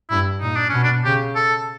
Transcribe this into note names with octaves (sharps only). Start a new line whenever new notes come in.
G2 E4
A#2 D#4
D4
B2 C#4
D4
C#3 G4
A4